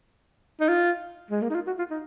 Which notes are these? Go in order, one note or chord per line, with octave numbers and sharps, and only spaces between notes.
D#4
F4
G#3
A#3
D#4
F4
F#4
F4
D#4